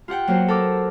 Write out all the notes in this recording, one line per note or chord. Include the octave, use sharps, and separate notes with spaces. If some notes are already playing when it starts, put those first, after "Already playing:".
F4 G4 F#5 G5
F#3 A#3 F#4 C5
A4 A#4 D6 E6